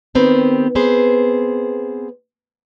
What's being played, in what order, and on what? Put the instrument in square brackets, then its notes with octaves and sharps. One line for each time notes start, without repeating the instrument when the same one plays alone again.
[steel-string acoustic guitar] D#3 B3 C4 G4 A#4
B3 C4 G#4 C5